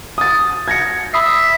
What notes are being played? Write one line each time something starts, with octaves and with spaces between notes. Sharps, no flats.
D#6 A6
G#6 A#6 C#7
E5 B5 D#6 C7